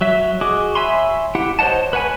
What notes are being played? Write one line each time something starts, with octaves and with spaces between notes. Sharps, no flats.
F#3 E5
F#4 G#4 D#5 D6
C#5 E5 G#5 B5 C6
E4 G4 F#5
C5 C#5 D#5 F#5 A5
B4 C#5 F#5 G#5 B5